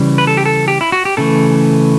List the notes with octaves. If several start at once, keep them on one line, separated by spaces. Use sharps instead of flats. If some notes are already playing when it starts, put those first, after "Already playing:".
Already playing: C#3 E3 G3
B4
A4
G4
A4
G4
E4
F#4
G4
C#3 E3 A3 A4